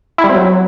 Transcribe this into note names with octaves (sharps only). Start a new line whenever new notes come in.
E4
G3
C4
F#3